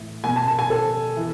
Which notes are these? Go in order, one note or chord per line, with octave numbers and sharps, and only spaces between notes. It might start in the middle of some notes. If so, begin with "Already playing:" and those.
Already playing: A2 E3
B2 G#5
A5
A5
G#5
A4
E3